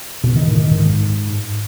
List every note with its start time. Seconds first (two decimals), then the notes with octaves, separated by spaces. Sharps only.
0.24 B2
0.35 D#3
0.47 A2
0.59 D#3
0.71 G#2